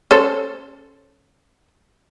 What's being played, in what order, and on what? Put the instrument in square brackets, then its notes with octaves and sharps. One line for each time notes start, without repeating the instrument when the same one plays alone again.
[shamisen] C#4 A4 C5